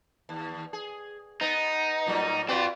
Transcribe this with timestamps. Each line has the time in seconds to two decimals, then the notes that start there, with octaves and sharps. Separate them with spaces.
0.29 D#2
0.73 G#4
1.41 B3 D#4
2.07 A2 F#3 G3
2.49 C4 F4 F#4 B4 D5